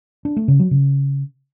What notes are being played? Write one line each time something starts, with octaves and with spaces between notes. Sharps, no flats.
D4
A3
C#3
F#3
C#3